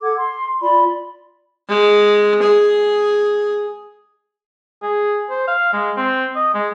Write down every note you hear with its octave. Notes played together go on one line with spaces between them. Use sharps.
A4 F#5 D6 G#6
C6
F4 D5 B5 C6
G#3
G#4
G#4
C5
F5
G#3
C4
D#5
G#3